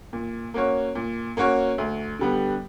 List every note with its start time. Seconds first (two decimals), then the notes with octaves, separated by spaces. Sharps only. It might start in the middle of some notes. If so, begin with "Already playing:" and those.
0.13 A#2
0.54 A#3 C#4 F#4 C#5
0.95 A#2
1.37 A#3 C#4 F#4 C#5
1.78 D2
2.19 D3 G3 B3